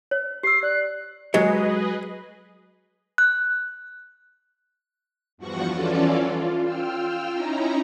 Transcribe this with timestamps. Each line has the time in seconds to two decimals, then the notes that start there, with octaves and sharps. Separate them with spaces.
0.11 C#5
0.43 G4 E6 C7
0.63 D5 F#6
1.34 D#2 F#3 G#3 G#4 B4 D#5
3.18 F#6
5.37 E2 G2 F3 F#4 F#5 C#6
5.71 E3 C#4 F4 A4 D5
6.25 F4
6.63 F4 G5 E6 F6
7.33 C#4 D#4 E4 A#5